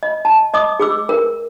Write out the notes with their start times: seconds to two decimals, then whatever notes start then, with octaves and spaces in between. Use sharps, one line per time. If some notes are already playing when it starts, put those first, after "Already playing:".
0.03 D#5
0.25 A5
0.54 D#5 D6 D#6
0.80 G#4 D6 E6
1.09 A#4